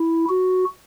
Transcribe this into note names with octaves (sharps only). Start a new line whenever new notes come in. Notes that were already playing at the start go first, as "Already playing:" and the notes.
Already playing: E4
F#4